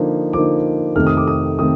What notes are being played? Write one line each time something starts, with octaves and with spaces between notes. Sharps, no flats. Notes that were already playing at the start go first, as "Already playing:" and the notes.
Already playing: D3 F3 A#3 D#4
D3 F3 A#3 D#4 D6
F2 C3 D#3 A3 C4 F6
D#6
D6
D#6
C3 D#3 A3 C4 D#6